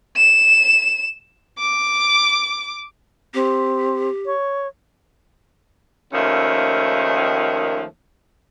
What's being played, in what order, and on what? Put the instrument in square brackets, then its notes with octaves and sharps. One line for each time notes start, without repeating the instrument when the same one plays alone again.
[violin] E7
D6
[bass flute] C4 [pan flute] G4
[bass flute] C#5
[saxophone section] D#2 D#3 F3 A3 C#4